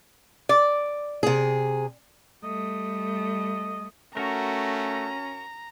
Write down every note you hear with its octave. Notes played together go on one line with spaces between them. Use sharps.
D5
C3 G#4
G3 A3 D#5
A3 C#4 F#4 A#4 A#5